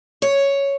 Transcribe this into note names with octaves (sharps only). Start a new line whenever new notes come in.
C#5